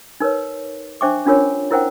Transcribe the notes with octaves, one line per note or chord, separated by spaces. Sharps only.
D#4 A#4 B4 C#5
D4 C5 E5 G5 C#6 D6
C#4 D4 F4 A#4 C#5
E4 A#4 C5 F#5 G5